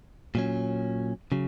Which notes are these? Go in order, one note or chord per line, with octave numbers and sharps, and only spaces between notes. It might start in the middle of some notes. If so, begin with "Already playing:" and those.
A#2 F#3 C#4
C#3 F#3